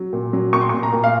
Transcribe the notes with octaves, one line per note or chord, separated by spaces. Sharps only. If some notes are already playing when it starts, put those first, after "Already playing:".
Already playing: F#3
A#2
F#3
A#2 C#6
C6
C#6
A#2
A#5
A#2
F5